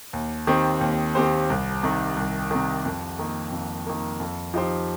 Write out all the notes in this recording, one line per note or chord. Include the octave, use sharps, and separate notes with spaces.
D#2
D#3 C4 G4 C5
D#2
D#3 C4 G4 C5
C2
C3 D#3
C2
C3 D#3
F2
D#3 A#3
F2
D#3 A#3
F2
F3 D#4 G4 C5